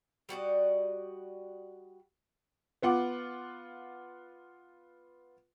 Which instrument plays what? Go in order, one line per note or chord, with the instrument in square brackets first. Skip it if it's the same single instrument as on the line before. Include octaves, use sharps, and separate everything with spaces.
[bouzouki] G3 F#4 D5 D#5
[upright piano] B3 F4 F#5 D6